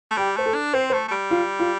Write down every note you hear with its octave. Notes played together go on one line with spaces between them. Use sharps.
A3
G3 G4
A3 C5
A4
D4
C4 C5
C5
A3
A3
G3
F4
F4